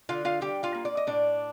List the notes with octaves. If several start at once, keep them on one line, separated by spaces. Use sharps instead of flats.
D3 F4 F5
F4 F5
G3 G4 G5
F4 F5
A#3
D5
D#5
A2 D4 D5